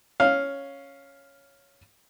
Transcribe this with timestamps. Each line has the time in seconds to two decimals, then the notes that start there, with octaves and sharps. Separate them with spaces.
0.20 C#4 F5